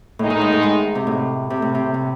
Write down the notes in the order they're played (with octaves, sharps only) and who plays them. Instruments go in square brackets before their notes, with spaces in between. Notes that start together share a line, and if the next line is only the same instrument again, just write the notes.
[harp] A2 [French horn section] D#3 G#3 D#4
[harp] A2
G#2
A2
G#2
C3
A2
C3
A2
C3
A2